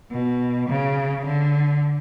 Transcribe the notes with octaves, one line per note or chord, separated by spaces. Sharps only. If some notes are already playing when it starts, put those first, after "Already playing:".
B2
C#3
D3